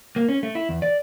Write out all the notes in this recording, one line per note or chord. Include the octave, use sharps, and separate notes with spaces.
A#3
C#4
A3
E4
E2
D5